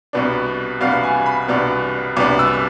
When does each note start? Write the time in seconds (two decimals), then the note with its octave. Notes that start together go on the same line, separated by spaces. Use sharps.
0.13 C2 B2 B3 D4
0.81 C2 B2 B3 D4 F5
1.03 G#5
1.26 B5
1.48 C2 B2 B3 D4
2.16 C2 B2 B3 D4 D6
2.39 E6